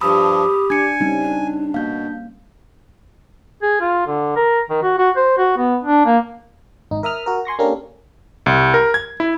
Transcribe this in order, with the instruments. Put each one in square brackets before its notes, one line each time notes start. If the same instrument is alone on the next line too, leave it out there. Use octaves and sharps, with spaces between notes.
[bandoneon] G2 F3 [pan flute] G4 [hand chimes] B5 D#6 E6
[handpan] D4 [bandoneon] G#5 [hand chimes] G#6 C#7
[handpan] G3 C4 C#4 [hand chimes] D#4
[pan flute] D4
[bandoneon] B2 [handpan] A#3 [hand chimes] F5 G6
[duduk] G#4
F4
D3
A#4
D#3
F#4
F#4
C5
F#4
B3
D4
A#3
[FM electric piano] G#1 D#4
A#4 E5 D#6 F6
F#4 A#4
G#5 C6 C#6 A#6
A#3 C#4 D4 G4 A4 A#4
[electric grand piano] C2
A#4
G#6
E4